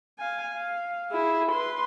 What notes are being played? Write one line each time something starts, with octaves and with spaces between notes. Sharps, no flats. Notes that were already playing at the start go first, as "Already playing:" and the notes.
F5 G#5
F5
E4 G#4
B4 C6